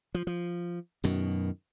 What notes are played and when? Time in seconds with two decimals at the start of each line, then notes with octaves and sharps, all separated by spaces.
0.15 F3
0.27 F3
1.04 F#2 B2 D#3